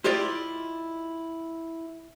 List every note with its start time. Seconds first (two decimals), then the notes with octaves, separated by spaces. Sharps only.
0.04 E4 F4 G4 D5 D#5